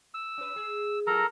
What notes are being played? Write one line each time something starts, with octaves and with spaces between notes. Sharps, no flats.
E6
C#4 B4
G#4
F3 E4 A4 A#4 A#5